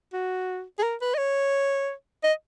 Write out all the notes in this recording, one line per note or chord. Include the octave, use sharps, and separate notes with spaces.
F#4
G#4
A#4
B4
D#5
C#5
D#5